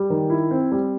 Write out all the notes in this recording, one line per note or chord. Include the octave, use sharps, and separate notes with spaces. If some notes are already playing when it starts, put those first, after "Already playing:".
Already playing: G3
D#3
E4
C4
G3